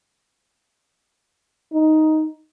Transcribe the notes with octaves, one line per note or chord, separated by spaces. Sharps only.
D#4